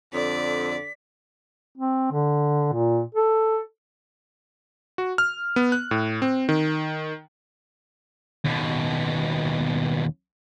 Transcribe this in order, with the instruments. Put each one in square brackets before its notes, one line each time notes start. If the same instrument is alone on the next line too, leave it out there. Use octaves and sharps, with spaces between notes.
[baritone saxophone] F2 [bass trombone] D3 [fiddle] D5 [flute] B6
[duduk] C4
D3
A#2
A4
[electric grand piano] F#4
F6
B3
F#6
A2
C4
D#3
[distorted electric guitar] D#2 B2